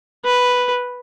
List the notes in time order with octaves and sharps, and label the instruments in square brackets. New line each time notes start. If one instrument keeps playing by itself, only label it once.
[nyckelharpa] B4